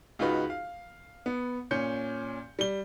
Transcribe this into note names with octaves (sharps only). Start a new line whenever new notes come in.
C#2 D#4 F4 F#4 B4
F5
B3
A#2 C#4 G6 C#7
G3 G7